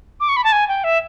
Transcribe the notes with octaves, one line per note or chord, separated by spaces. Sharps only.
D6
C#6
B5
A5
G#5
G5
E5